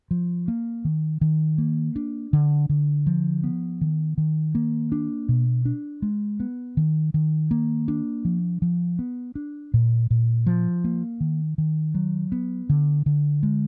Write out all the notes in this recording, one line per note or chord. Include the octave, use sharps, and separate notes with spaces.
F3
A#3
D#3
D#3
A#3
D4
D3
D3
F3
B3
D#3
D#3
A#3
D4
B2
D4
G#3
B3
D#3
D#3
A#3
D4
F3
F3
B3
D4
A#2
A#2
F3
A#3
D#3
D#3
F#3
B3
D3
D3
G#3